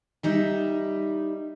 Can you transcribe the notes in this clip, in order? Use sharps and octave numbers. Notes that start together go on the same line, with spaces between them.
G3 D#4 E5